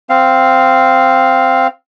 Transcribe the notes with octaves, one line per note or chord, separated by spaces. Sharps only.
C4 F5